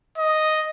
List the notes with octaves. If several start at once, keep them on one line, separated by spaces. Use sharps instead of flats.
D#5